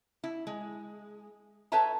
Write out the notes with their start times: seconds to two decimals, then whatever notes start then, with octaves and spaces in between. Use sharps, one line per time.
0.24 E4
0.47 G#3
1.72 A4 B4 C#5 E5 A5 A#5